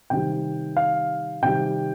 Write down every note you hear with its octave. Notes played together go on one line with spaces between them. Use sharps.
C3 D#3 G3 G5
F5
C3 D#3 G3 G5